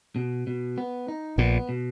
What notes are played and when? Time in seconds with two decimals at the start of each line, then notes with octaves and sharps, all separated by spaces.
0.16 B2
0.47 B2
0.78 B3
1.08 D#4
1.38 A#1 A#2 B3
1.69 B2